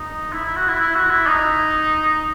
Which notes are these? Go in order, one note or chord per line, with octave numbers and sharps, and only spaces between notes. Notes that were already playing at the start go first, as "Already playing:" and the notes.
Already playing: D#4
E4
E4
F#4
E4
E4
F#4
E4
D#4